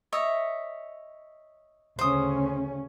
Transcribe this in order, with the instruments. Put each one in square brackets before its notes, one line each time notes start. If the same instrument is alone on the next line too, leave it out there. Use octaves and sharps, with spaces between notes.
[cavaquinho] C#5 D#5 E5
[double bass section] D2 C#3 C#4 [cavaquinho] C5 D#6